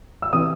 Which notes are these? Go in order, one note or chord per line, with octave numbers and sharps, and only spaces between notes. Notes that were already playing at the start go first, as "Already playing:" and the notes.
E6
C3 E3 D#6